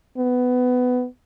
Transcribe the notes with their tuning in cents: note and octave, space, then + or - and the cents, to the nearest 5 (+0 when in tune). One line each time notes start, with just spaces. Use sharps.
B3 +15